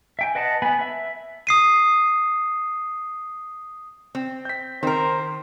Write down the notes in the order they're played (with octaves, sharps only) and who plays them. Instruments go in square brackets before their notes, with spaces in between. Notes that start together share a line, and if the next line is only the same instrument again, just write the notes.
[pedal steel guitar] E5 G5 G#5
B4 D#5 F#5 A5
B3 G#5 B5
E5
[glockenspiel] D#6 C7 D#7
[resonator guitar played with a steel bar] C4
[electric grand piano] G6 B6
[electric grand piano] D#3 [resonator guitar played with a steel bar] C4 A#4 [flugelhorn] C5